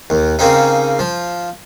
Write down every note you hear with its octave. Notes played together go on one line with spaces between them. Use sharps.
D#2
C#3 A#3 C4 C#4 D#4
F3